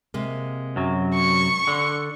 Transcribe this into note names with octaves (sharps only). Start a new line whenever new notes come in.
C3 G#3 A#3
F#2 F#3
C#6
D3